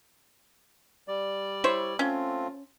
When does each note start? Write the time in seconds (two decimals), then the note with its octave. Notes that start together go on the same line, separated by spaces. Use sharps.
1.08 G3 D5
1.64 E4 C5 C#5
1.99 A3 C4 C#4 F4